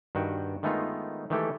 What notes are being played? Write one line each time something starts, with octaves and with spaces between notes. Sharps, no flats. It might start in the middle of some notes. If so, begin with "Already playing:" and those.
G2 D#3 F#4 G5
D#3 G#3 A3 B3 D#4 F4
D#3 E3 G#3 A3 G4 A4